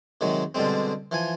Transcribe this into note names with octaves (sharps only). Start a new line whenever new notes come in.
C3 D#3 F#3 G#3
B2 D3 G3 G#3 C4
E3 F3 G#5